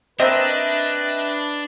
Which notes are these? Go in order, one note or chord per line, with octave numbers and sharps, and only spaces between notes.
A#3 C4 D4 B4 D#5 E5 G5